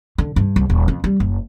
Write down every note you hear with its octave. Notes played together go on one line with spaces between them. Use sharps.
D3
G2
C2
D#1
F2
G3
F#1